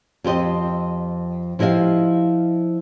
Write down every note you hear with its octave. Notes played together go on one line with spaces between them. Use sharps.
F2 G4 C5 D#5
F3 E4 G4 D#5 F5